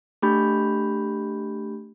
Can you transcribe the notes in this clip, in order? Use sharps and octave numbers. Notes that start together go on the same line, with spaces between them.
A3 D4 G4 B5 G6